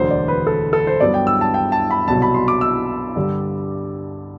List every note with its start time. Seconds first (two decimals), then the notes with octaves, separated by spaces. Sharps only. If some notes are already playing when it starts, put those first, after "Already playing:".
Already playing: E1 D2 D3 F#3 C5
0.11 D5
0.28 B4
0.47 A4
0.73 A4
0.87 C5
1.00 G2 F#3 B3 D4 D5
1.14 G5
1.27 E6
1.41 A5
1.54 G5
1.72 A5
1.91 B5
2.08 C2 B2 F#3 A5
2.22 B5
2.34 C6
2.48 D6
2.61 E6
3.16 G2 D3 G3 D4